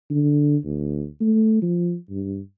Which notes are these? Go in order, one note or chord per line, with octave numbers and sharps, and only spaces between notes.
D3
D2
A3
F3
G2